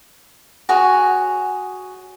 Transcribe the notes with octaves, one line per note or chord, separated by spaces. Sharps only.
F#4 G#4 C#5